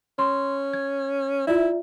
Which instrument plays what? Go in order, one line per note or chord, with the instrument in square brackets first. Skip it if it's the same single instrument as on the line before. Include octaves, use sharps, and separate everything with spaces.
[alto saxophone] C#4 [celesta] C6
[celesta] G#6
[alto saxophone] E4 [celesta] F4 D5 E5